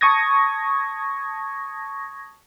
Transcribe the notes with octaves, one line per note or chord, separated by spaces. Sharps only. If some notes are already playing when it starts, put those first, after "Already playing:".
A5 C#6 D#6 G#6 A#6